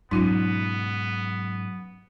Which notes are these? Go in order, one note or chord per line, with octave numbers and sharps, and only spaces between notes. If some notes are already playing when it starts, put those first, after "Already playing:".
G#2 B2 F#3 B3 C#4 D#4 F4